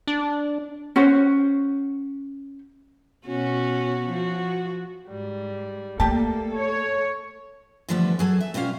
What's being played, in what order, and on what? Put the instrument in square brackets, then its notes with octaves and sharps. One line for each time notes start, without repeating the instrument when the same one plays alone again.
[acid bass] D4
[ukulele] C#4 F#4 C5
[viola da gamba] B2 C#4 F#4
F3 F#4
[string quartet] G#2 G3
[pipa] G3 G4 A5 [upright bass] A3 [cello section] A#3 [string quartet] A4
[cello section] C#5
[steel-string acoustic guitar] D3 E3 F3 G3 A3 B3
F#3 G#4 A4
E5
B2 G3 C#4 F4 F5